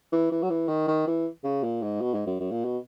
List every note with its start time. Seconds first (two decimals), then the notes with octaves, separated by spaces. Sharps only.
0.12 E3
0.32 E3
0.43 F#3
0.50 E3
0.68 D#3
0.88 D#3
1.07 E3
1.44 C#3
1.63 A#2
1.82 G#2
2.01 B2
2.14 G#2
2.26 F#2
2.39 F#2
2.51 A#2
2.65 B2